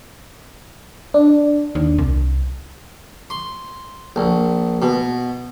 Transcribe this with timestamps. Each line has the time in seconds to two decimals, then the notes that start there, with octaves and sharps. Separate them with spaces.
1.14 D4
1.75 D#2
1.98 C2
3.30 C6
4.16 A#1
4.82 B2